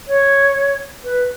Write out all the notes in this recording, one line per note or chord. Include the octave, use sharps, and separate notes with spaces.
C#5
B4